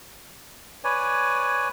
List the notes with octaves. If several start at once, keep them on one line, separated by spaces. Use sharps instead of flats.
B4 C#5 D5 G#5